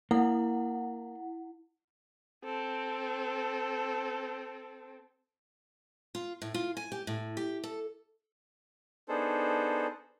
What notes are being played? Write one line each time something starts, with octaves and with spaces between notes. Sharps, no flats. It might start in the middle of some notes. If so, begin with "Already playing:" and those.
A#3 E4 F#5
C4 A4
F4
A2
F4
G#5
G4
A2
G4
A4
B3 D4 D#4 G#4 A4 C5